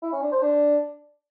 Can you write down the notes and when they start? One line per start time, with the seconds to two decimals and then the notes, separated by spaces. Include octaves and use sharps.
0.02 E4
0.12 C#4
0.22 D4
0.32 C5
0.42 D4